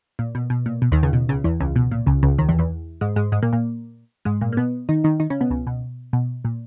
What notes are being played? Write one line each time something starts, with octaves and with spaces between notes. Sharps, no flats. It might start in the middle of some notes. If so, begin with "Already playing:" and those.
A#2
B2
B2
A#2
B2
D#2 D#3
C#2 C#3
B2
C#2 C#3
E2 E3
C#2 C#3
B2
A#2
C#2 C#3
C#2 C#3
D#2 D#3
E2 E3
E2 E3
G#2 G#3
G#2 G#3
G#2 G#3
A#2 A#3
A#2 A#3
G#2 G#3
A#2 A#3
A#3
B2 B3
D#3 D#4
D#3 D#4
D#3 D#4
C#3 C#4
B2 B3
C#2 C#3
B2
B2
A#2